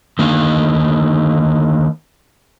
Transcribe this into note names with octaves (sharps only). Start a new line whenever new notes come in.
D3 D#3 A#3